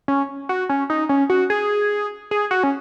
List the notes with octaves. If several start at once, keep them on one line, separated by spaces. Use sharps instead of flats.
C#4
F#4
C#4
D#4
C#4
F#4
G#4
G#4
F#4
C#4